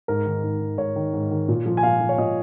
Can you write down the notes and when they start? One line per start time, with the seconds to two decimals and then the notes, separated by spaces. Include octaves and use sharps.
0.08 G#2 A#4
0.26 D#3
0.43 G#2
0.61 D#3
0.78 G#2 C#5
0.96 D#3
1.13 G#2
1.31 D#3
1.48 A#2
1.66 F3
1.77 G#5
1.83 A#2 F5
2.01 F3
2.09 C#5
2.18 A#2 D#5